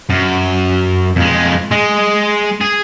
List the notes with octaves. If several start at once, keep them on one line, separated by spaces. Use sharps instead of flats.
F#2
F2 G#3
G#3
G#4